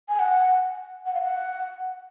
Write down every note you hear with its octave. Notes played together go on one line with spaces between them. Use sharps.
G#5
F#5
F#5
F5
F#5